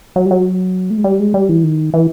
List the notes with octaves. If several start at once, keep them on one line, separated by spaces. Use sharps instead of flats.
F#3
G3
F#3
A3
G#3
G3
G#3
G3
E3
D#3
E3